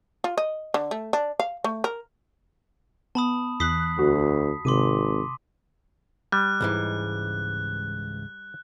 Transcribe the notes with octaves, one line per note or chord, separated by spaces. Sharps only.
F4
D#5
D3
A3
D4
F5
A3
A#4
B3 A5 B5 D#6
E2 D#6 F#6 B6 C7
D2 F#4
G#1 C3 C6 D6 D#7
G3 F#6
C#2 G#2 E3